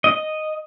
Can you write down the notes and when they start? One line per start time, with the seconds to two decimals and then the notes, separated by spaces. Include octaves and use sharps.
0.04 D#5